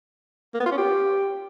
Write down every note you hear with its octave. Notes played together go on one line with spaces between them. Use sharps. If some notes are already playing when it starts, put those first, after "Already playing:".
A#3
B3
F4
C#4
G4